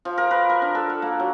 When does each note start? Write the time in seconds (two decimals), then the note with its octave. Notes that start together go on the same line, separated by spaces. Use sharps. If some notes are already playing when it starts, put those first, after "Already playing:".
0.05 F3
0.18 A#4
0.31 B4
0.50 A#4
0.62 D4
0.75 A4
0.90 F#5
1.02 A#3
1.20 F#3